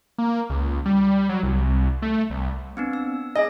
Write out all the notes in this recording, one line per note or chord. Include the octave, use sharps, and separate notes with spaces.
A#3
C#2
G3
F#3
C2
A3
C2
B3 C4 D4
E6
G#4 D#5 G#5 A#6